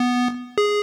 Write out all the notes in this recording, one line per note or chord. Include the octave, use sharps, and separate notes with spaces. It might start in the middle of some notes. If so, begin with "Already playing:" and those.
Already playing: B3
G#4